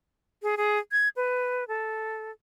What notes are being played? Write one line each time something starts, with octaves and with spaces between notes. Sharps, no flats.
G#4
G#4
G#6
B4
A4